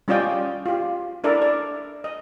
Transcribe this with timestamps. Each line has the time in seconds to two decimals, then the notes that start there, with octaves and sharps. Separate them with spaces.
0.08 G3 C#4 F4 D5 D#5 G5
0.66 F4 G4
1.24 D4 E4 A4 A#4 D5 E5
1.42 D5
2.04 D#5